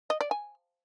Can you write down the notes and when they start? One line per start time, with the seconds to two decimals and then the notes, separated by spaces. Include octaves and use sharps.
0.10 D#5
0.21 D5
0.31 G#5